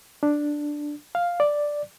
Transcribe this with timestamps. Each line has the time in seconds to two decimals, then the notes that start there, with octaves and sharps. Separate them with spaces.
0.23 D4
1.15 F5
1.40 D5